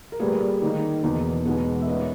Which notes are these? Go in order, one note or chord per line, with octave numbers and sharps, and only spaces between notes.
A#4
A#2 G3 A#3 G#4 B4
D#3 A#3 D#4
E2 B2 A#3 D#4
E2 B2 G#3 B3 D#4 G#4 B4
E5
A#2 A#3 C#4 B4 D#5